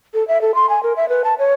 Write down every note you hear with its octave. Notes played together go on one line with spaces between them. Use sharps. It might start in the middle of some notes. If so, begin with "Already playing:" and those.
A4
E5
A4
C6
G#5
A#4
E5
B4
A5
C#5